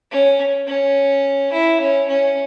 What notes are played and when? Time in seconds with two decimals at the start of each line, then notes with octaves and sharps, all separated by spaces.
0.11 C#4
0.67 C#4
1.53 E4
1.80 C#4
2.08 C#4